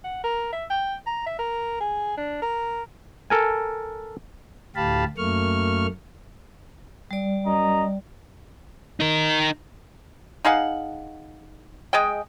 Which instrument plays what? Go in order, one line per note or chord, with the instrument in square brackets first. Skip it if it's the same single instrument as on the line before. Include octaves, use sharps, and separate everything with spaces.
[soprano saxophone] F#5
A#4
E5
G5
A#5
E5
A#4
G#4
D4
A#4
[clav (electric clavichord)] A4 A#4 G#5
[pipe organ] D2 A2 G4 F5 A5 B5
F#2 A3 A#3 C#6 F6
[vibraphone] G3 D5
[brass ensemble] F#2 D#5 A#5
[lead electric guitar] D#4 A#4
[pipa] D#4 G#4 F5 F#5
G#3 G#4 D#5 G5